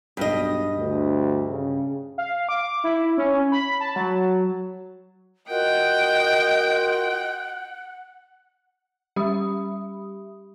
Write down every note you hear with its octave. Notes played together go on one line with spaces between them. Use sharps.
B1 G2 D#5
D2
C#3
F5
D6
E4
C#4
B5
A5
F#3
F4 F#4 A#4 D#5 F#5 G5
G3 G4 E5 B5 D#6